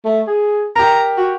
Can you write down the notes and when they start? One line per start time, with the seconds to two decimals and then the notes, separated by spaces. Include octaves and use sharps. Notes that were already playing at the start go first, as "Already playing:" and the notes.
0.05 A3
0.27 G#4
0.76 G4 A#4 A#5
1.17 F#4